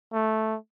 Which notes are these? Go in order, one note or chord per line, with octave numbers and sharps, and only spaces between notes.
A3